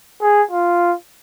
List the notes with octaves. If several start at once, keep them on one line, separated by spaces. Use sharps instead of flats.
G#4
F4